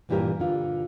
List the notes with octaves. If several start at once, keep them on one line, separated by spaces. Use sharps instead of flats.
G2 A#2 E3 G3 G4 A#4
D3 F4